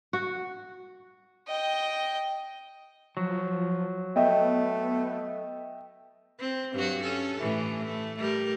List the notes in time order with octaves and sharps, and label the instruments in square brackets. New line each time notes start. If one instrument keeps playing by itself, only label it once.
[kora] F#4
[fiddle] D#5 G5
[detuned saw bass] F3 [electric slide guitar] F#3
[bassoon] A3 [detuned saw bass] B3 [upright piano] D#5 E5 G5
[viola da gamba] C4
G2 F#3 F#4
C#4 A4
A2 E3
A3
G3 A3 A#4